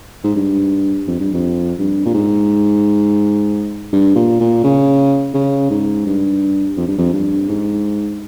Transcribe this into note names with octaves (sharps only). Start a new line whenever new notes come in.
G#2
G2
F2
G2
F2
G2
A#2
G#2
G2
A#2
A#2
C#3
C#3
G#2
G2
F2
G2
F2
G2
G#2